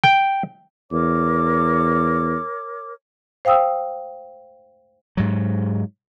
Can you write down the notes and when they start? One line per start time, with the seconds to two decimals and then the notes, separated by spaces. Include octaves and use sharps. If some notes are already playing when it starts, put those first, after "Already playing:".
0.04 G5
0.92 E2 A#4 C#5 D6
3.45 C5 F5 G5 D#6 E6
5.17 G#2 F#3